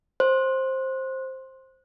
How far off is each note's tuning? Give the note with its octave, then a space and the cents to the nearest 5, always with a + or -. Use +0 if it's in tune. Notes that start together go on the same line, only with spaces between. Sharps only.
C5 +10